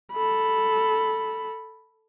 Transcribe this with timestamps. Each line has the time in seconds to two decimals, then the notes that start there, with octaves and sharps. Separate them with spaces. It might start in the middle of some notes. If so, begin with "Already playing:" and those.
0.13 A4 B5